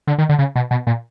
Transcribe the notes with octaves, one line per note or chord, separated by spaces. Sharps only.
D3
D#3
D3
C#3
B2
B2
A#2